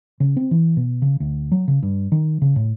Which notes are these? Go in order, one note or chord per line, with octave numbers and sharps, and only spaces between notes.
C#3
C4
E3
B2
C#3
D2
F#3
C#3
G2
D#3
C#3
A2